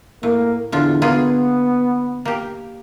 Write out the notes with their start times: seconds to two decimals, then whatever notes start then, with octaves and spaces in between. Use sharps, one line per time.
0.23 A2 A#3
0.72 E2 D3 F4
1.02 A#3 B3 F4 G#4
2.25 A#3 G4